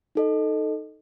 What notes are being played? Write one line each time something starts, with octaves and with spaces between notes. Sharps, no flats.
D#4 A4 D#5